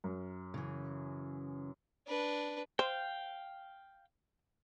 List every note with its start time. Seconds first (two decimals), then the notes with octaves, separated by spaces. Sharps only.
0.04 F#2
0.54 C#3 E3
2.07 D4 B4
2.79 C5 F5 G5